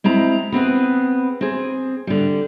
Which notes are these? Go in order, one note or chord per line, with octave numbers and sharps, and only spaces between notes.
G#3 C4 E4 A#5
B3 C4 G#4 B4
C4 G#4
D3 G3